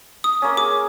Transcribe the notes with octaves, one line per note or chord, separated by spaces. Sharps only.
D#6
A#3 C#4
G#4 D6